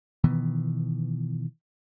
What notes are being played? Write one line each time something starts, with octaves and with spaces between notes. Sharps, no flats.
B2 D#3 E3 B3